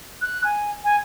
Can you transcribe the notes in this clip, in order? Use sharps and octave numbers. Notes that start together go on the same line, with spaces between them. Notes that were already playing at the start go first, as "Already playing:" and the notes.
F#6
G#5
G#5